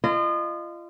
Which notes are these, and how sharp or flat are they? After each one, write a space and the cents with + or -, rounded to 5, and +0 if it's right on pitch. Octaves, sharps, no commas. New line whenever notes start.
F4 -30 D#5 -30